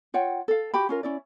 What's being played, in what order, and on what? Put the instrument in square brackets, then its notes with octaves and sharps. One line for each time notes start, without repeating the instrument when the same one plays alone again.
[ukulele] F4 C#5 F#5 G5
A4 F5
F#4 G4 G5 B5
C#4 F4 A#4
C#4 E4 D5